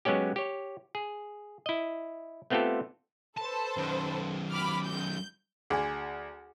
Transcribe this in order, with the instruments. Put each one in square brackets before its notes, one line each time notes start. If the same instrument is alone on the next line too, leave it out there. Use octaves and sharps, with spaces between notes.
[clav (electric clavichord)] F#3 G#3 B3 C#4 G4
G4 C#5
G#4
E4 D#5
A3 B3 C4 F4 G4 A4
[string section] A4 B4 C5 [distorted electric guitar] A5
[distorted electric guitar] F#2 D#3
[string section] B5 D6 F6
G6
[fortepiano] D2 [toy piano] G#4 D5 G#5